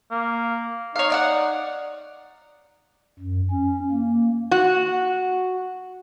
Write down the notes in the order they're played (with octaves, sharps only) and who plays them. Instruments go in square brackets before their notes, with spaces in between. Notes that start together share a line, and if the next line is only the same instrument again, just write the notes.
[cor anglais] A#3
[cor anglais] D#4 [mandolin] C#5 F5
[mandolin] D5 F5 F#5
[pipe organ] F#2
C#4
A#3
[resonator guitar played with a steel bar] F#4